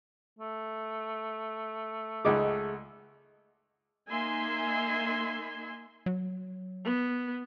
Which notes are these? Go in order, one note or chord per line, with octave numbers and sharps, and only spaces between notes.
A3
C#2 D#4 G#4 D#5 F#5 D6
A#3 D#4 E5 G#5 C6
F#3
B3